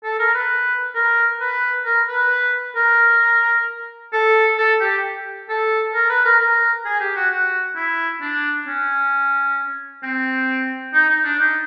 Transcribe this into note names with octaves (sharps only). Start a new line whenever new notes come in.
A4
A#4
B4
A#4
B4
A#4
B4
A#4
A4
A4
G4
A4
A#4
B4
A#4
A#4
G#4
G4
F#4
F#4
E4
D4
C#4
C4
D#4
D#4
D4
D#4